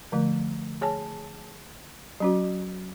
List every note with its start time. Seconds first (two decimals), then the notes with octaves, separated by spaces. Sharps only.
0.12 D3 F3 A3
0.81 G#4 C#5 G#5 A5
2.20 F#3 C#4 F#4